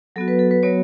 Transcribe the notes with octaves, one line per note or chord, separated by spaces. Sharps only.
F#3 B3 F#4 A4
B4
A4
B4
F#3 B3 F#4 C#5